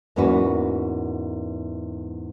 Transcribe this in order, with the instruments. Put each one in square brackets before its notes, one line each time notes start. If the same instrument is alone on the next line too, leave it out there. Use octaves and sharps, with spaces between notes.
[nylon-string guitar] E2 G#2 A#3 C#4 F#4 B4